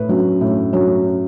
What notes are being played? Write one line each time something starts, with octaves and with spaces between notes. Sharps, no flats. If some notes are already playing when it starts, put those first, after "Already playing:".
Already playing: A2 B4
F#3 C#4
A2
F#3 C#4